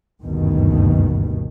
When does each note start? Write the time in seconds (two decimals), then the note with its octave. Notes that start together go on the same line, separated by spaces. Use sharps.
0.23 F#1 D2 G2 B2 D#3